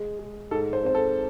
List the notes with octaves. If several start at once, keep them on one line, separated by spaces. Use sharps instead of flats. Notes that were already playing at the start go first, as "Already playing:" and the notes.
Already playing: G#3
G#3
G#2 A4
C5
C4 C5
A4